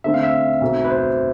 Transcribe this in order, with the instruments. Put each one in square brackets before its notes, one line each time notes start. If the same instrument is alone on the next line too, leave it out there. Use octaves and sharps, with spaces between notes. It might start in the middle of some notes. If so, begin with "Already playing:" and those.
[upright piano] D3 A3 C4 [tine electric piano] E5
[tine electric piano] F5
E5
[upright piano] B1 B2 A3 C4
[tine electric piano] B4
C5